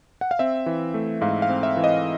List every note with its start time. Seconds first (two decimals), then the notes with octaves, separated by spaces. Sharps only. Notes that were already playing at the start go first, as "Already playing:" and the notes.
0.21 F#5
0.31 F5
0.39 C4 E5
0.66 E3
0.94 A3
1.21 G#2 F5
1.42 F5
1.49 C4
1.63 E5
1.77 E3
1.84 D#5